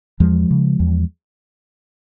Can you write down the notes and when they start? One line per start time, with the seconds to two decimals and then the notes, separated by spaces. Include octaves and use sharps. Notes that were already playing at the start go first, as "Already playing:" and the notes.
0.20 E2 F3 G#3
0.51 C#3
0.80 E2